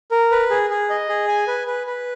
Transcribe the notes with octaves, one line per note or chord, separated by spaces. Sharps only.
A#4
B4
G#4
G#4
D#5
G#4
G#5
B4
B4
B4